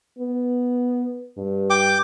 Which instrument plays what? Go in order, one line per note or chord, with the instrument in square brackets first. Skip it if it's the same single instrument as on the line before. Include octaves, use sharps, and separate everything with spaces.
[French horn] B3
G2
[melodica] G5 D6